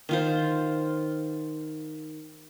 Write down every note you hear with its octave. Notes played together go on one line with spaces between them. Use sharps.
D#3 F4 C5